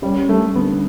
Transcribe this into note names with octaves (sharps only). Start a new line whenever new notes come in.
G3 C#4
G3 A3
D3 B3